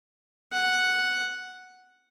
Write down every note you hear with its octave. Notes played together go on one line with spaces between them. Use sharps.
F#5